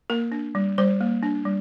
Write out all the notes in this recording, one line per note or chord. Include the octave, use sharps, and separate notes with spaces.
A#3 A#4
D4
G3
G3 C5
A#3
D4
G3